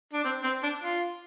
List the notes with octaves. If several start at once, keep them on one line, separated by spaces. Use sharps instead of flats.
D4
C4
C4
D4
F4